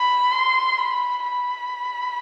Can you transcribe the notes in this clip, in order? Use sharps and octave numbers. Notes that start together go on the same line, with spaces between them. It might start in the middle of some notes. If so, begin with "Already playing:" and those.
Already playing: B5
C6
B5
B5